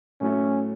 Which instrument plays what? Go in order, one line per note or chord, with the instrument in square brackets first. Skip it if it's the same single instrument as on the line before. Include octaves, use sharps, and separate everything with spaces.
[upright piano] A2 F#3 A3 [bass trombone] C#4